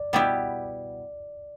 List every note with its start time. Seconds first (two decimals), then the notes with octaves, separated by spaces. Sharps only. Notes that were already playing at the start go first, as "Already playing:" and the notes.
Already playing: D5
0.13 B2 G3 B3 E4 G4